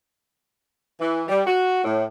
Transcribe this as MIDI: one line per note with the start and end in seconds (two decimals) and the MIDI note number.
1.00 1.23 52
1.28 1.43 55
1.46 1.84 66
1.84 2.05 45